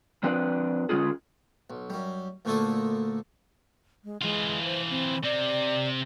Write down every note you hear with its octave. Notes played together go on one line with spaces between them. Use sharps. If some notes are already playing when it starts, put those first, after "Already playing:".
F3 C4 D4 B4 D5
D3 G#3 C#4 F4 G#4
B1
F#2 G3
D2 A#2 A3 A#3 A4 D#6
G#3
E3 G#3 F4
C5
C4
C3 C4 D5